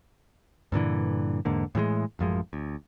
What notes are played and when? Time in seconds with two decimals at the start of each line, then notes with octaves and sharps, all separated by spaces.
0.72 G2 A#2 D3 E3
1.45 E2 G#2 D3 A#3
1.75 A2 E3 F#3 G#3
2.19 A1 F#2 F3 G#3
2.53 D2